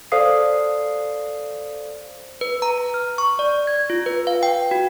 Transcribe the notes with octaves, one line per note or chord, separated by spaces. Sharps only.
A4 C5 D5 F5 D#6 C7
B4
A#5
A#5
F6
C#6
D5
G#6
F4
B4
F5
G5
F#4